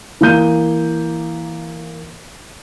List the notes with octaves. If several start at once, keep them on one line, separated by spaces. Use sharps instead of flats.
E3 A#3 G6 D#7